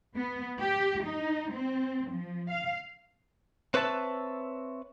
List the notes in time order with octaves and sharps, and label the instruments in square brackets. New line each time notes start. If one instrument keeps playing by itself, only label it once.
[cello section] B3
G4
D#4
C4
F3
F5
[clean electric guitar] C4 B4 C#5 E5 A5